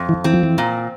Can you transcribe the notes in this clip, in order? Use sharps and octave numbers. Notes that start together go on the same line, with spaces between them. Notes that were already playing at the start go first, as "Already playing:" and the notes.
Already playing: F2
E3
E3 C4
F3
E3
A#2